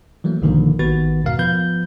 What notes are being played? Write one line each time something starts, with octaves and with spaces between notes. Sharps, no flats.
E3 F#3 A3 A#3
B1 G#2 D3 D#3 F3 A#3
A1 D#3 B3 F#4 B4 A6
E2 G#2 B2 A#4 F5
F3 B3 B4 G6